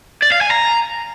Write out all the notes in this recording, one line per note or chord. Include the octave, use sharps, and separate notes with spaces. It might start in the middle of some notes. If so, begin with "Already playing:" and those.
D5
F5
G#5
A#5